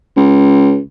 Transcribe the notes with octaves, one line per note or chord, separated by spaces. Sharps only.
C#2